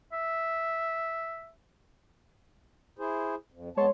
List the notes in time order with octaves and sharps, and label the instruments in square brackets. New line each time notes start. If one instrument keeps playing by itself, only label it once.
[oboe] E5
[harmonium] E4 G#4 C5
F2
[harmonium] F2 B3 A5 [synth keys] G#3 C#5 C6